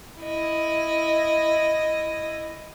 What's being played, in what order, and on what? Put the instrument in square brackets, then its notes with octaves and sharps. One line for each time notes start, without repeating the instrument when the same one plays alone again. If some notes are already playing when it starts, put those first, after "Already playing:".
[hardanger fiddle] E4 D#5